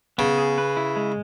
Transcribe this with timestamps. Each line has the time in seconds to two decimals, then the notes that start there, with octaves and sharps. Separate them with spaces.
0.18 C#3 B3
0.38 G#4
0.58 B4
0.77 E4
0.96 G#3